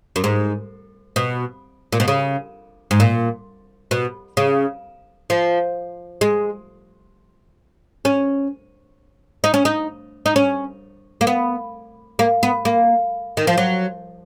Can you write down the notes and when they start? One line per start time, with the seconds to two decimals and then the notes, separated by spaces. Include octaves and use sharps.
0.16 F#2
0.24 G#2
1.16 B2
1.92 A#2
2.00 B2
2.08 C#3
2.91 G#2
3.00 A#2
3.91 B2
4.37 C#3
5.30 F3
6.21 G#3
8.05 C#4
9.44 D#4
9.54 C#4
9.65 D#4
10.26 D#4
10.36 C#4
11.21 A#3
11.27 B3
12.19 A#3
12.43 B3
12.65 A#3
13.37 D#3
13.47 F3
13.58 F#3